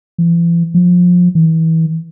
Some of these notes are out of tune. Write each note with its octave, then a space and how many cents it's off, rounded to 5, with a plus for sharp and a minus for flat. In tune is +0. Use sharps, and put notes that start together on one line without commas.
E3 +45
F3 +25
E3 -30